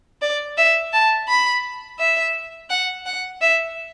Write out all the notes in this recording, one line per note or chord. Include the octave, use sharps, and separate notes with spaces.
D5
E5
A5
B5
E5
F#5
F#5
E5